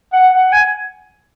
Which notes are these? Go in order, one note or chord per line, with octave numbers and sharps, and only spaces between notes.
F#5
F#5
G#5